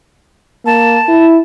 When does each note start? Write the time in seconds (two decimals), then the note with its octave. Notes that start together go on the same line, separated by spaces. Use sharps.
0.66 A#3 A5
1.09 E4